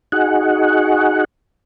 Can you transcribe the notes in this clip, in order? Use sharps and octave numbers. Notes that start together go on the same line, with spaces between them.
D#4 F#4 G#4 F#5